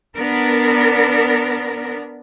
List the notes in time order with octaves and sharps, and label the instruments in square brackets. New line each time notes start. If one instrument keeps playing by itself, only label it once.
[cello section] B3 D4 A#4